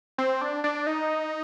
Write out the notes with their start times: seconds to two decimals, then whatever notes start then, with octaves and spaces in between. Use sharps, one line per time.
0.18 C4
0.41 D4
0.64 D4
0.87 D#4